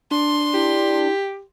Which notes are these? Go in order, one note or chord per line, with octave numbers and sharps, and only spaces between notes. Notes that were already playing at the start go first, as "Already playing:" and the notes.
D4 C6
E4 G4